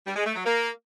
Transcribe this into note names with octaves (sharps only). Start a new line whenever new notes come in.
G3
G#3
A3
F#3
A#3